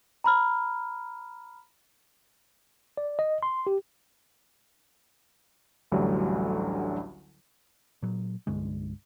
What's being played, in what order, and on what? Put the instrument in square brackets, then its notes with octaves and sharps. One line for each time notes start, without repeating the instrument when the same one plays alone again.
[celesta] A#5 B5 F6
[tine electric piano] D5
D#5
C6
G4
[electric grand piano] A1 D2 D3 F#3 G3
[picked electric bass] A#2 F#3
C2 G2 D3 G#3